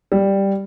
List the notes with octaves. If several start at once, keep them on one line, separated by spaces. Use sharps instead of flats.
G3